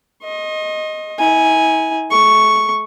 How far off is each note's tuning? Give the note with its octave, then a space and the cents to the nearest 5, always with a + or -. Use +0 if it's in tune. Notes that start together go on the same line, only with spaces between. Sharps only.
D#5 +0 C6 +45
E4 -40 G#5 +0
A3 -35 C#6 +0